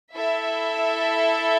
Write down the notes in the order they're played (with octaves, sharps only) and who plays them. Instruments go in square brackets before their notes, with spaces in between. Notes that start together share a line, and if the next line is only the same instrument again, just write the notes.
[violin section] E4 A4 E5